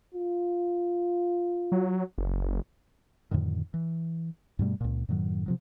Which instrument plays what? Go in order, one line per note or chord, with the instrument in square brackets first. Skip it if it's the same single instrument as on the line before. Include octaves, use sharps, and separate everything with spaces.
[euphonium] F4
[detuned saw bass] F#3
F#1
[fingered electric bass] F2 A2 D3 D#3
E3
G2 B2 G3 A3
C#2 A#2
F#2 A2 D#3 F#3
C3 F3 F#3